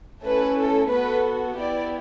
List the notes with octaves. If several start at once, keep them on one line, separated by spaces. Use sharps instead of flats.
A3 C#4 E4 A4 B4
A4
B3 F#4 A4 B4
B3 E4 G4 D5